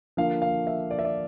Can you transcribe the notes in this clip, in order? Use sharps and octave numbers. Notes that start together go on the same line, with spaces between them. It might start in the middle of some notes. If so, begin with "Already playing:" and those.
D3 F3 A#3 F5
F5
E5
D5
E5
D5